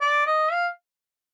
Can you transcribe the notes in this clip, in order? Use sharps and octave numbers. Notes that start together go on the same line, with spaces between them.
D5
D#5
F5